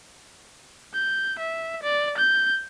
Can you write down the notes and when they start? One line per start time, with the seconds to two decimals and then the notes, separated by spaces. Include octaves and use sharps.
0.94 G6
1.39 E5
1.83 D5
2.18 G6